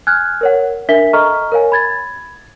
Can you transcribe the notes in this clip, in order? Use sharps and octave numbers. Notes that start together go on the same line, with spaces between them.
G#5 F6 F#6 G#6
A#4 C#5 F#5
D4 A#4 E5 B6 G7
A4 D#5 A#5 C#6 F6
A#4 C#5 F5 G#5
B5 G#6 A6